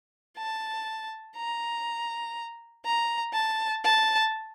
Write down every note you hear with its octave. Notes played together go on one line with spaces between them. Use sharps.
A5
A#5
A#5
A5
A5